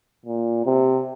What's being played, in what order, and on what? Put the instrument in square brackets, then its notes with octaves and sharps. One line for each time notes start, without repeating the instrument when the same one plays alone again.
[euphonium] A#2
C3